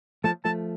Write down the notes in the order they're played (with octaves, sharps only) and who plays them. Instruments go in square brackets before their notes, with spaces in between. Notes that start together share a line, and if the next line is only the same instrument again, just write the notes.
[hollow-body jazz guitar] F3 A3 [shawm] A5
[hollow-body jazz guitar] F3 A3 [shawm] A5